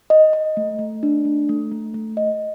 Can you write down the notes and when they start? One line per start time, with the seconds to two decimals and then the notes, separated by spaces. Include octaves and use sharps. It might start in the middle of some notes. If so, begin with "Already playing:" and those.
0.10 D#5
0.33 D#5
0.57 A3
0.79 A3
1.03 D4
1.25 A3
1.49 A3
1.72 A3
1.94 A3
2.17 D#5